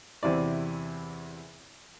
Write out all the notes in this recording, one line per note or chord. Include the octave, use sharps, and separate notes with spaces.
E2 C3 E4 D5